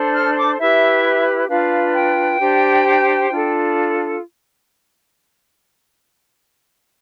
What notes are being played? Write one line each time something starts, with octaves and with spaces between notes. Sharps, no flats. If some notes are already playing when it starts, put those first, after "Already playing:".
Already playing: D4 A4 C5
F6
D6
E4 G4 B4 E5
D4 F4 B4 F5
G5
D4 G4 C5
D4 F4 A4